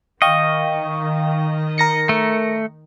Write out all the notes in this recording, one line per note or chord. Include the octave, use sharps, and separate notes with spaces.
D#3 D#5 F5 G5 C#6
A#4 A#6 C#7
A3